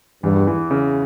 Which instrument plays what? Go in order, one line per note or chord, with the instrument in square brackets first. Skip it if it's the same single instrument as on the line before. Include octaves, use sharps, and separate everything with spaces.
[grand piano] E2 [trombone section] G2
[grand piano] E3
C#3